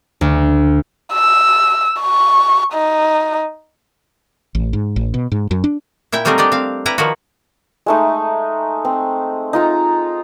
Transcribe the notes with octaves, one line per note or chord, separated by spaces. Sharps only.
D2
E6
C#6
D#4
A1
G#2
A1
B2
G#2
F#2
D4
A#2 E4 E5 G5
F#3 G3 A3 C4 D#4 A#4
D4 G4 D5 D#5
C4 F5
G3 E4 B4 A#5
D#3 F3 E4 F#4
G#3 A3 D#4
C4
D#4 F4 A#5